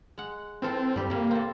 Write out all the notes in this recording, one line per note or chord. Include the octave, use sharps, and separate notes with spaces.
G#3 F#5
E3 C4 F4 A4
G2 G3 G4
C3 G3 A#3
C4 A4